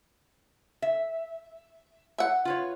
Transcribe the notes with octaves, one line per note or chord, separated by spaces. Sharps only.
E5
E5 F#5
F4 B4 C#5